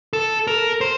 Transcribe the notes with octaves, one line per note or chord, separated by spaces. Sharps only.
A4
A#4
C5